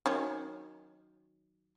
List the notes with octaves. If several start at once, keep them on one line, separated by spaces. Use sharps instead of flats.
D#3 F#3 C#4